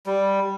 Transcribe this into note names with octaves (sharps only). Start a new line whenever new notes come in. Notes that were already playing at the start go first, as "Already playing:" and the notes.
G3